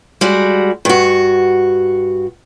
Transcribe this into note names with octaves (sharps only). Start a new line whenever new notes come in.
G3 G#3 F#4
G2 F#4